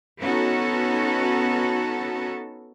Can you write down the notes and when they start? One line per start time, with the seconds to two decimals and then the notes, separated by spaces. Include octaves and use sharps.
0.22 B3 C#4 D#4 F#4 A4